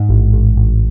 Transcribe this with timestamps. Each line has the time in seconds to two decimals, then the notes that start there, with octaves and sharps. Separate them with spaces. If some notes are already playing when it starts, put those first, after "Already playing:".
Already playing: G#2
0.09 A1
0.33 A1
0.57 A1